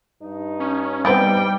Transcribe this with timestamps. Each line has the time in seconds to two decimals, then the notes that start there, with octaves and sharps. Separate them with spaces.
0.22 G2 D#4
0.60 C#4
1.05 G3 B3 C4 B4 G5